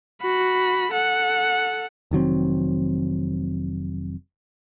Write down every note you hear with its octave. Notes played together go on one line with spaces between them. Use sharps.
F#4 B5
A4 F#5
F1 D#3 F#3 C4